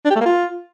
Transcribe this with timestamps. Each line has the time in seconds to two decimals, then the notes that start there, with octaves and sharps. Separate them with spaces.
0.05 D4
0.10 G4
0.16 A3
0.21 A#3
0.26 F4